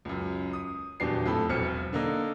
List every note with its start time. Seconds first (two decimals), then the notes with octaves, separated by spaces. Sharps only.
0.05 C#2 F#2
0.53 D#6
1.00 D#1 E2 F#3 D4 G4 C7
1.26 F2 A2 A4 B5
1.49 E1 B1 C4 F6 C#7
1.93 D3 A#3 D#4